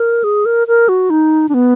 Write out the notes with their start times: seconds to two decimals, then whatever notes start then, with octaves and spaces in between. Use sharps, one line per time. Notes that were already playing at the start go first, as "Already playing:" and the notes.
Already playing: A#4
0.24 G#4
0.46 A#4
0.68 A#4
0.89 F#4
1.10 D#4
1.49 D4
1.54 B3